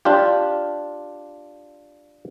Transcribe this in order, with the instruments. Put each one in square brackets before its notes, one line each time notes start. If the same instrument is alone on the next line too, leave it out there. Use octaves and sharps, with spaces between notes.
[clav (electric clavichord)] D4 F4 G4